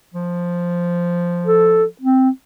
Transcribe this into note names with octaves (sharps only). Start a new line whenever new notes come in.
F3
A4
C4